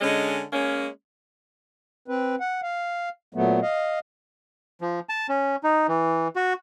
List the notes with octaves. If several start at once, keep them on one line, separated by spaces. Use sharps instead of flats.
D3 G#3 C#4 D#5
G#3 A#3 C#4
C4 B4
F#5
F5
A#2 F#3 A3 B3
D#5 F5
F3
A5
C#4
D#4
E3
F#4